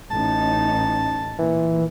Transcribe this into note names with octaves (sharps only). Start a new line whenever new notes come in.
A1 C#4 D#4 A5
A#2 E3